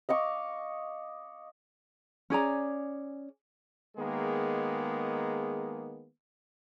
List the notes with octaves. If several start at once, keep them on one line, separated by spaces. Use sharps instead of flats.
D#5 F5 C#6 D6
C#4 G#4 D5 A#5
D#3 G#3 A#3 B3 G#4